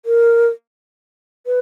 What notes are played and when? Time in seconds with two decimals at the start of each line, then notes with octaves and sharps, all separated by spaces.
0.06 A#4
1.46 B4